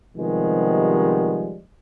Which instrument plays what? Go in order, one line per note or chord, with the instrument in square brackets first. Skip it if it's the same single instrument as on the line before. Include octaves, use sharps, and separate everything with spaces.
[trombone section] C3 D#3 F3 G3 G#3 B3